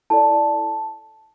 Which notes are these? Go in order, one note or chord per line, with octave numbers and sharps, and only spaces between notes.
E4 A4 D5 A5